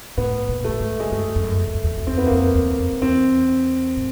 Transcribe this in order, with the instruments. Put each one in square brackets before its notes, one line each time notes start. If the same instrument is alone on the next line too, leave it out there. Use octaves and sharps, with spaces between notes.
[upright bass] A2 [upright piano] B3
[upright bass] A#2
[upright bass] A2 [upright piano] A3
[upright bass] G#2
[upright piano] G#3
[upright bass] G2 [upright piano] A3
[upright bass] F#2
F2
F#2
F2
E2
F#2
[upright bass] F2 [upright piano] C4
[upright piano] B3
[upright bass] F2 [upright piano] A#3
[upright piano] B3
[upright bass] E2
F2
F2
[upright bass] E2 [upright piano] C4
[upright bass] A2